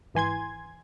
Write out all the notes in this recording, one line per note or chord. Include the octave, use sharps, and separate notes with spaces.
G#1 E3 G#5 C6 G#6